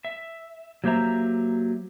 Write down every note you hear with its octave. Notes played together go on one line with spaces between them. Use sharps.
E5
F#3 A#3 G4 C5 E5 A#5